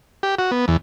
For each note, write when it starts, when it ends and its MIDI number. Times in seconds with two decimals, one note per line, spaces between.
0.23 0.35 67
0.39 0.51 66
0.51 0.65 59
0.68 0.77 40